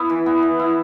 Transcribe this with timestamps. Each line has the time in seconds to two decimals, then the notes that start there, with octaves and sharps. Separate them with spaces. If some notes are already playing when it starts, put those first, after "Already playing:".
Already playing: B3 E4
0.10 E3
0.26 B3
0.42 E3
0.59 E4